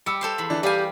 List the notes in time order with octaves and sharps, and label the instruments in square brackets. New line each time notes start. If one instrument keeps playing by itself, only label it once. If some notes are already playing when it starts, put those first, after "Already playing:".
[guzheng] G3 [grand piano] D6 E6 C#7
[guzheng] A4 C5 F5
E2 B5
[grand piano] E3 D4
[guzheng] G3 G#5 [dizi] G4 [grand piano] D5 F5